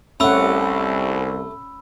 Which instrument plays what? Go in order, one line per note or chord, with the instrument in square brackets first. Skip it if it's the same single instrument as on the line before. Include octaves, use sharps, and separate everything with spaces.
[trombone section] C2 [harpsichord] A3 [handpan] C#4 F#5 [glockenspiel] B5 E6